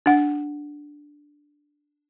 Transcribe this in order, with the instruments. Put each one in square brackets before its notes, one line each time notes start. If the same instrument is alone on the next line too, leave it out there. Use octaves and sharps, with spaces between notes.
[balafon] D4 F#5